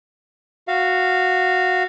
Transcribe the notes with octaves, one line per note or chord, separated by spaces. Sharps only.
F#4 F5